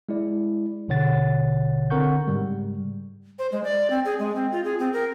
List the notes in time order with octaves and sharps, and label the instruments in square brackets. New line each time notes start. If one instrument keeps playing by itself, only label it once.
[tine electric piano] G#3 E4 D5
A1 B2 D3 C#5 F#5 A6
D3 C4 A#4 F#5 C#6 G6
G#2 C#3 G3 G#3
[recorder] C5
G#3
D5
C4
G#4
G#3
C4
F4
G#4
C4
A#4